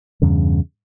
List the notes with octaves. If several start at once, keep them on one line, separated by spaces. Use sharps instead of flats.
E2 G2 C#3